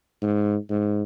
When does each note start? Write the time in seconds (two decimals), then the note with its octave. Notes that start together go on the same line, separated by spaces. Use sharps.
0.23 G#2
0.70 G#2